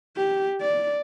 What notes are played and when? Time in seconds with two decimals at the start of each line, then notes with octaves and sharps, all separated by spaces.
0.17 G4
0.61 D5